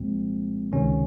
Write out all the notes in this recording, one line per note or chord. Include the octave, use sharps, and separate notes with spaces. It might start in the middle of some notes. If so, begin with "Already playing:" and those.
Already playing: C2 A#2 F3 G#3 C4
C#2 C3 D#3 C#4